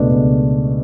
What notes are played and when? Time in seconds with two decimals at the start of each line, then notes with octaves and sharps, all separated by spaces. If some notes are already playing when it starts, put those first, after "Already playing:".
Already playing: C#2 B2 A3 D4
0.11 C#2